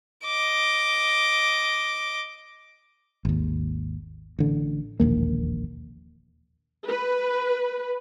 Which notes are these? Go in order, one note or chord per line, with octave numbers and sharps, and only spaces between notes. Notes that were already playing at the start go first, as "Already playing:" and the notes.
D#5 D6
G#1 D#2
A1 D3
E1 A#1 D#2 A#3
B4